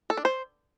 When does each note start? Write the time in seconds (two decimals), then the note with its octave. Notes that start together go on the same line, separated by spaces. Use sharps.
0.10 A4
0.17 D4
0.25 C5